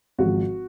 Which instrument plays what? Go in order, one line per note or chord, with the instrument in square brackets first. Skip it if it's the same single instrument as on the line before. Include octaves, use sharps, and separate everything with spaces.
[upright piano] G#1 G#2 F3 F#4